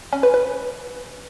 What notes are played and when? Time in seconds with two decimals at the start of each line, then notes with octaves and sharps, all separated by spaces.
0.13 C#4
0.23 B4
0.34 B4